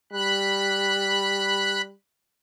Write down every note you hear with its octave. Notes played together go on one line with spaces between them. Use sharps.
G3 B5 F#6